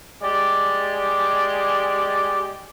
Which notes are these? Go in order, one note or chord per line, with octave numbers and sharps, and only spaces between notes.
G#3 G4 D5